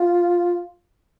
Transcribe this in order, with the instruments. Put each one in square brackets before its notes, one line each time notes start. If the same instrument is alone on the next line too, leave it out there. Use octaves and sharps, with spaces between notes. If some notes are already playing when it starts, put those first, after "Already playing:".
Already playing: [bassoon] F4